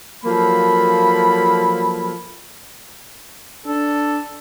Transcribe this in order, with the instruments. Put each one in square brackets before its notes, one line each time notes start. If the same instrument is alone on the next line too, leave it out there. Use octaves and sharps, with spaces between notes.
[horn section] F3 F#3 A#3 A4 B5
[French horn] D4 [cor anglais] A4